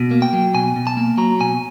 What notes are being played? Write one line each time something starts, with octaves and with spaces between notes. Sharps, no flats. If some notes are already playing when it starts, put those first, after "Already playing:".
Already playing: B2
A#3
G5
F#3
B2 G#5
B2
A5
A#3
F#3 A#5
B2 G#5